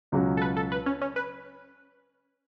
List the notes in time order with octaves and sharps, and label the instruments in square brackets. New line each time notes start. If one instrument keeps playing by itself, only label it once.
[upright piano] C#2 B2 F#3 C#4 F#4
[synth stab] A4
B4
A4
B4
C#4
C#4
B4